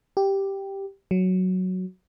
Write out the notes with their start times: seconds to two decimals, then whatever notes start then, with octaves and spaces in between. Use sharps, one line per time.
0.17 G4
1.11 F#3